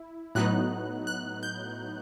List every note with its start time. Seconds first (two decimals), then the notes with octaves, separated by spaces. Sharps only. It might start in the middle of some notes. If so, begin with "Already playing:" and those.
Already playing: E4
0.35 A2 F#3 B3 D#4 F#6
1.07 F#6
1.43 G6